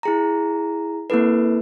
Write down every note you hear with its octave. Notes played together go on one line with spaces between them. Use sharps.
E4 G#4 A#5
A#3 C4 E4 A4 B4